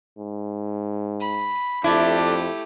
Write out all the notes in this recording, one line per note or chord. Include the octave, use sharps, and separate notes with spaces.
G#2
B5
F2 A3 D4 E4 G4